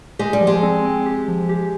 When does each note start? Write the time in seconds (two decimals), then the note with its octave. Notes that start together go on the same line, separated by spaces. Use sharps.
0.19 G#3 G4
0.33 G3
0.41 F3
0.47 G#3
0.63 C4
0.85 C4
1.06 G4
1.28 F3
1.49 G4